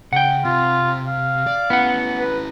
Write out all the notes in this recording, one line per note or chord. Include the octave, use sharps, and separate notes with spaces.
C#3 F#5 G5
C3 F4
F5
D5
B3 C#4 E4 F#5
B4